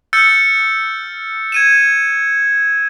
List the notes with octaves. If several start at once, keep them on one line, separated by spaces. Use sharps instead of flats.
E6 F6 G6 A6 C#7
G#6 D#7 E7